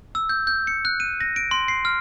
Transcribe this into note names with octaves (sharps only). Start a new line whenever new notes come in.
E6
G6
G6
C#7
F#6
D#7
A#6
D7
C6
C7
F6